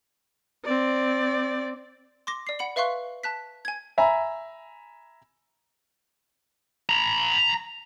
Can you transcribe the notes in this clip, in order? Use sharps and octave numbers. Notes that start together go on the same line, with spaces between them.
C4 D5
C6 D6 A#6
D5 C7
F#5 B5 C#7 F#7
B4 E5 F5 C6 C#6 F#6
A5 F#6 B6
G#5 G#6
E5 G#5 A#5 B5
A#5 B5